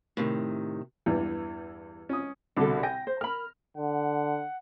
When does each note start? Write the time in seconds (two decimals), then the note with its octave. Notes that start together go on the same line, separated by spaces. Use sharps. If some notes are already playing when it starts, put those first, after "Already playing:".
0.17 A2 C3 D#3
1.06 E2 G2 E3 G3
2.09 C#4 D#6
2.57 C2 B2 D3 D4 A4
2.83 G5 G#5 A#6
3.07 C5
3.21 A#4 B5 F6
3.77 D3 F#5